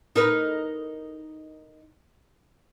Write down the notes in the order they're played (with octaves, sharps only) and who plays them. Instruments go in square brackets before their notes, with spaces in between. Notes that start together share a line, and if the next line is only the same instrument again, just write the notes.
[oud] D#4 A#4 B4